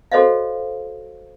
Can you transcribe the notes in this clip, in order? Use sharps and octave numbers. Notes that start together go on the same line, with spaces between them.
F#4 A4 C5 C#5 D#5 F5